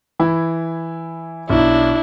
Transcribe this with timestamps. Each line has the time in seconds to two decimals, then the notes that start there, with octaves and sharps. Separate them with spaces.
0.19 E3 E4
1.50 B1 D4 E4